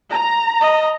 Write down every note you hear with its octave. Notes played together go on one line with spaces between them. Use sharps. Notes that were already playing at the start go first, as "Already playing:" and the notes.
A#5
D#5